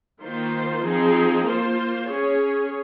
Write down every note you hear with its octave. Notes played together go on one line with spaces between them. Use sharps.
D#3 A#3 F4 C5
F3 C4 D#4 G#4
A#3 F4 C5
C#4 G#4 C#5